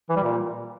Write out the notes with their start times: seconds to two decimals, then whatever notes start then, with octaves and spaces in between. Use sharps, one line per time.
0.09 E3
0.16 G3
0.23 A#2